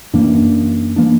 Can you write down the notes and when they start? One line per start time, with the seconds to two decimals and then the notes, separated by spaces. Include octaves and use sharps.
0.13 F#2 E3 A#3 D4
0.96 E3 A#3 D4